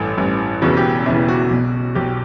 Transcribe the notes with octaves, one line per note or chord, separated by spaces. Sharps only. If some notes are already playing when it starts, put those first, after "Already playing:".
Already playing: A1 G2 E3 A4
A1 G2 E3
E1 E2 C#3 E3 F#4
G4
E1 E2 C#3 E3 E4
F#4
B1 B2
B1 B2 G4